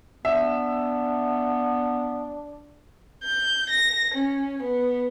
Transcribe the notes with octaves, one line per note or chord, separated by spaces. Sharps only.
B3 D4 E5
G6
A#6
C#4
B3